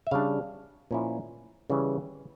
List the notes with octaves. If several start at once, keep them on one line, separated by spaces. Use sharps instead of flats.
E5
C#3 G3 D4 F5
A#2 F3 C#4 E4
C#3 E3 G3 C#4